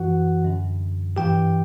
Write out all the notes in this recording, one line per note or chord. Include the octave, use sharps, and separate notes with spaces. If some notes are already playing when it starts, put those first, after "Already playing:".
Already playing: F#2 E3 F#4 F#5
F#2 D3
G2 E3 G4 G5